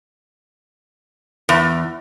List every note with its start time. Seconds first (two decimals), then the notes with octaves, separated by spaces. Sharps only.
1.49 E2